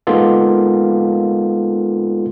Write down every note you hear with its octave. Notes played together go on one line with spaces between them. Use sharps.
G#3 A#3 B3 D#4 F4 A4